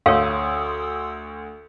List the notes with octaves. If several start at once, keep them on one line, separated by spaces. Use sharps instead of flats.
D2 C#5 F5 C6 D#6 E6